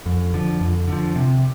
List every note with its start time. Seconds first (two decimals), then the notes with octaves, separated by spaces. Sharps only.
0.06 F2
0.34 D3 F3
0.61 F2
0.87 D3 F3
1.16 C3